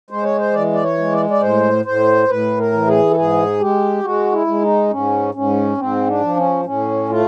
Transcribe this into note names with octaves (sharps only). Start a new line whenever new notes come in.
G#3 C5
C#5
C5
E3 D5
D5
C#5
G#3
D5
D5
A2 C5
A2 C5
A2 B4
A#4
E3
G#4
A4
G#2 G#4
G#3 G4
G#3 F#4
E4
G#3
D#4
G#2 C#4
G#2 C#4
G#2 C4
D4
F3
C#4
A2 C#4
A3 F4